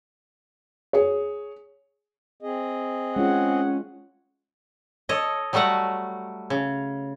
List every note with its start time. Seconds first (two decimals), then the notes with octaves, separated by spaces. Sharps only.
0.93 G#4 C#5
2.42 C4 G#4 D#5
3.16 G#3 C#4 F4 F#5
5.09 A4 C#5 D#5
5.53 F#3 G3 A3 F#4 F#5
6.50 C#3